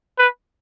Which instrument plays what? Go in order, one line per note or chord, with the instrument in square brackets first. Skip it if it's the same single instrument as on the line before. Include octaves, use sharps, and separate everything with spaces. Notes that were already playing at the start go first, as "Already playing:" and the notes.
[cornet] B4